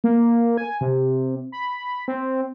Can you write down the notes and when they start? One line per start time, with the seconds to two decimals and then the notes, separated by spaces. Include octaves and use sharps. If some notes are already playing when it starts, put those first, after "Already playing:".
0.04 A#3
0.58 G#5
0.81 C3
1.52 B5
2.08 C4